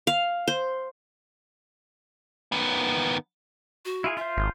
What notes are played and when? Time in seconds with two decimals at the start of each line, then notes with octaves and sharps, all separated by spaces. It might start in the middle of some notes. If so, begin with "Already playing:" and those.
0.07 F5
0.48 C5
2.52 D#3 B3
3.85 F#4
4.04 E4 F4 G#4
4.17 F4 C5 E5
4.37 G#1